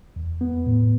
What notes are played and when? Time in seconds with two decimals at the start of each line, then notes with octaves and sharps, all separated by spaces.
0.16 E2
0.41 B3
0.67 A2